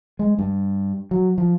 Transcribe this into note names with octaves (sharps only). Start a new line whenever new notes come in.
G#3
G2
F#3
F3